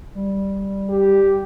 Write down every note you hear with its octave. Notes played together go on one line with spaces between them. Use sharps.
G3
G4